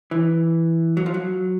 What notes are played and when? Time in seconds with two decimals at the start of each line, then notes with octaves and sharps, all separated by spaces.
0.11 E3
0.97 F#3
1.06 F3
1.14 F#3